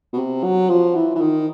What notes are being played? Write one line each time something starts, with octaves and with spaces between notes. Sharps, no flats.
B2
C3
F#3
F3
E3
E3
D#3